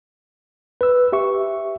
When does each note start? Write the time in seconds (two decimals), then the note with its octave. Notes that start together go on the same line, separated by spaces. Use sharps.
0.81 B4 E6
1.13 G4 E5 C#6